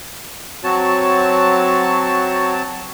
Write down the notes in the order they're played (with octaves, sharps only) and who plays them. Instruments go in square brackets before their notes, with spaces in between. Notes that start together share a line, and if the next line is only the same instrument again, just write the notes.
[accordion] F#3 C4 A5 [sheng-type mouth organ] F#4 C#5